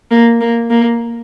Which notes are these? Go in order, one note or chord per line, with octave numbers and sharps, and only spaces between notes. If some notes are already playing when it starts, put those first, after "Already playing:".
A#3
A#3
A#3